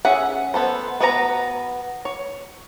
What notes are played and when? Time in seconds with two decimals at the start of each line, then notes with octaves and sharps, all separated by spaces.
0.05 C#4 G#4 E5 F#5
0.54 B3 A4 C5
1.00 B3 F#4 B4 C#5 A#5
2.05 C#5